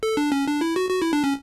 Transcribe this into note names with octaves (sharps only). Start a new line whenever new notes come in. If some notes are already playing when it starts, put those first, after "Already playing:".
A4
D4
C#4
D4
E4
F#4
F#4
E4
D4
C#4